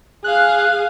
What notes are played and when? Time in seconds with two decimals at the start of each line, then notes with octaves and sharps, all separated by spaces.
0.24 G#4 F5 F#6